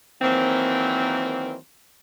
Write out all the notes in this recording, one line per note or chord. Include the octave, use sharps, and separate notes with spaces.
D#3 E3 F#3 A#3 C4